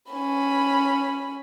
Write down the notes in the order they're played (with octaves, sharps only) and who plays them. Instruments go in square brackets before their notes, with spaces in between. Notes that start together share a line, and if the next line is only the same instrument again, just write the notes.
[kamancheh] C#4 B5